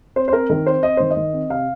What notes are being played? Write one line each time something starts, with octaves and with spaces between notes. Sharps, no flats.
C4 C5
C5
C4 A#4
D#3 A#4
C4 C5
C4 D#5
D#3 C5
D#5
D#3
C4
C3 F5